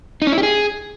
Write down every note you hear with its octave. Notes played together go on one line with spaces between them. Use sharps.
D#4
C#4
E4
G4
G#4